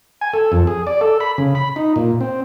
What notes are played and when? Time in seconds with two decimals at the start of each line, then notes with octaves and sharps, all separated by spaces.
0.21 G#5
0.34 A4
0.52 F2
0.67 G#4
0.87 D5
1.01 A4
1.20 B5
1.38 C#3
1.55 B5
1.76 D#4
1.96 A#2
2.21 C4